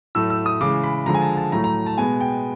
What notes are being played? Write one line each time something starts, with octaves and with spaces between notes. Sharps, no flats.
A2 F#3 A3 E6
E6
D#6
C#3 E3 G#3 D6
B5
D3 F3 G#3 A#5
G#5
A5
A5
A2 F#3 A3 A#5
A#5
A5
B2 G#3 B3 G#5
G5